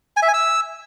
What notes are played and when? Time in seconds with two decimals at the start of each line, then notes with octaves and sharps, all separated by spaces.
0.17 G#5
0.22 E5
0.28 G#5
0.34 E6